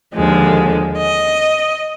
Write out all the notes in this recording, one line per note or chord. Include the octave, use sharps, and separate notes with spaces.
D#2 D3 F3 G#3
D#5